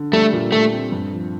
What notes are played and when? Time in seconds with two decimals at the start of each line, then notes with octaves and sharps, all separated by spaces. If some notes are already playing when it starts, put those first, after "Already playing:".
Already playing: D3
0.13 G3 A3
0.33 A#2
0.52 A#2 A3
0.73 C4
0.92 G2
1.13 F3